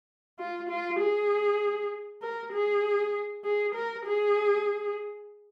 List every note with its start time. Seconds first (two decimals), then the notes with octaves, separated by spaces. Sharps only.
0.39 F4
0.69 F4
1.00 G#4
2.22 A#4
2.53 G#4
3.44 G#4
3.75 A#4
4.06 G#4